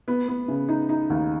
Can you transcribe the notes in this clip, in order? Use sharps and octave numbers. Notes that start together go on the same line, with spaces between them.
B3
B3
C#3
D#4
D#4
D#2